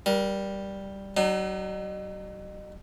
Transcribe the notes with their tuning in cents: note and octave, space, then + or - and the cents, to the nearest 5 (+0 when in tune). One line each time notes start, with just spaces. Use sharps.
G3 +0 A#4 +35
F#3 +35 D#4 -35